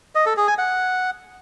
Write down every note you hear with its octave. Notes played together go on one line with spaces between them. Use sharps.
D#5
A4
G#4
G#5
F#5